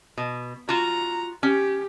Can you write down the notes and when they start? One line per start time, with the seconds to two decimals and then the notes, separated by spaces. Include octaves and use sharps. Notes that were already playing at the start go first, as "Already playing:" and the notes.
0.18 B2
0.69 F4 F#4 A#5
1.43 C#4 G4